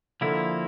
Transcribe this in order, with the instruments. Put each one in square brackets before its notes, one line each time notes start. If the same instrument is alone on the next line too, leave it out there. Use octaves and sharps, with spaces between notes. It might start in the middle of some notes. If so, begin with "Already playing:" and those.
[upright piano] D3 [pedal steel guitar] F3 A#3 E4